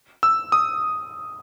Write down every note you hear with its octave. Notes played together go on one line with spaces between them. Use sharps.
E6
D#6